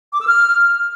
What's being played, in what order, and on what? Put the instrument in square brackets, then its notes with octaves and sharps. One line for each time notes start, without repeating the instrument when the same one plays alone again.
[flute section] D6
E6
F6